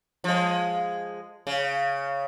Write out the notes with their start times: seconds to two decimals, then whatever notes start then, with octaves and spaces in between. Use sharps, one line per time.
0.24 F3 G#3
1.47 C#3